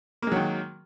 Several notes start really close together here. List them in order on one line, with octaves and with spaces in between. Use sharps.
A#3 G#3 F#3 D#3